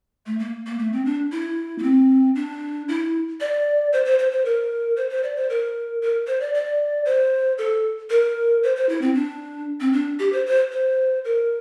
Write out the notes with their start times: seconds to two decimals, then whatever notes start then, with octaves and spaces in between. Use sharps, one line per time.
0.26 A3
0.39 A#3
0.66 A#3
0.78 A3
0.93 C4
1.05 D4
1.32 E4
1.79 A#3
1.83 C4
2.35 D4
2.88 E4
3.40 D5
3.93 C5
4.05 C5
4.19 C5
4.31 C5
4.45 A#4
4.96 C5
5.10 C5
5.23 D5
5.36 C5
5.50 A#4
6.02 A#4
6.27 C5
6.40 D5
6.54 D5
7.05 C5
7.58 A4
8.10 A#4
8.63 C5
8.76 C5
8.89 E4
9.02 C4
9.14 D4
9.80 C4
9.93 D4
10.19 G4
10.33 C5
10.46 C5
10.72 C5
11.25 A#4